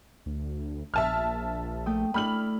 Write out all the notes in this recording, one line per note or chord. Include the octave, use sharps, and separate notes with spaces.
D2
A#1 E5 A5 F6
A3 G5 D#6
A3 D4 E4 B5 F6 F#7